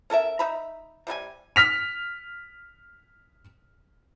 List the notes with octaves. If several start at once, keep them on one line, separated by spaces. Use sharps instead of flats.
C#4 A4 A#4 E5
D#4 E5 A#5 B5
C3 G3 E4 G#5
F6 B6 F7